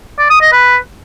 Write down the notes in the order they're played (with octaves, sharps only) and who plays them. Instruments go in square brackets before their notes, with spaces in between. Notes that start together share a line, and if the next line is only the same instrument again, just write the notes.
[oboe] D5
D#6
D#5
B4